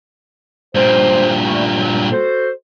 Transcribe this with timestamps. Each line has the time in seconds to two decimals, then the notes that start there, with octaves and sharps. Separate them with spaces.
0.75 G2 A#2 C5
1.44 G3 A3
1.75 F#3
2.11 F#4 A4 C5